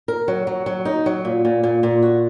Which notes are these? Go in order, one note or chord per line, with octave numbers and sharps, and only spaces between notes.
A#4
F#3
F#3
F#3
D#4
F#3
A#2
A#2
A#2
A#2
F#4